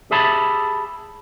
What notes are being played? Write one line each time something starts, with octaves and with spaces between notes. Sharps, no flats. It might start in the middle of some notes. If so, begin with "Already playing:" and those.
G4 G#4 E5 A5 B5